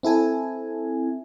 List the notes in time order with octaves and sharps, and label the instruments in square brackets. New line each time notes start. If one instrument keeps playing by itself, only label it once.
[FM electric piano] C4 E4 A4 G#5